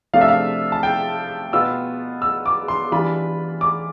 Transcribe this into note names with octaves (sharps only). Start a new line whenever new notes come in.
C3 F3 A3 D4 F4 F5
E5
F5
A5
G5
B2 B3 F4 E6
E6
D6
C6
E3 G3 D4 F4 B5
D6